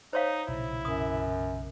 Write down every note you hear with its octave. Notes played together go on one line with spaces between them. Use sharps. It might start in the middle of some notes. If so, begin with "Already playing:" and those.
D#4 C5 C#5 F5
B1 A#2 C#3 E4
F#2 D#6